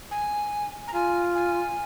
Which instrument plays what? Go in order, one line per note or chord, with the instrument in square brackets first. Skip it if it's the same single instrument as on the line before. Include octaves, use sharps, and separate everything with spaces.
[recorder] G#5
A#5
[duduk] F4 [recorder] G#5
[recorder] G#5